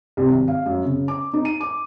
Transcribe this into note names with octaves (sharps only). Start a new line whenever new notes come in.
C2
G#1
F5
F#2
C#3
D6
D#4
D#7
D6